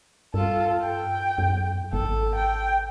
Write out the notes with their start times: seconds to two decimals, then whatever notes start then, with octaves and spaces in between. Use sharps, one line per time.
0.34 G2 F4 A4
0.82 G5
1.38 F#2
1.93 G#1 A4
2.35 G5